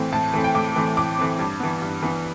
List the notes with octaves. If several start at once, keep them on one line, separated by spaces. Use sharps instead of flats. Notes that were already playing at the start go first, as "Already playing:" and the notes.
Already playing: A2 E3 A3 C4
A2 A5
E3 A3 C4
G5
A2 D6
E3 A3 C4
A2 D6
E3 A3 C4
G2
E3 B3
G2
E3 B3